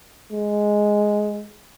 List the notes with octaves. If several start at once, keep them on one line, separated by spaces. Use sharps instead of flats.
G#3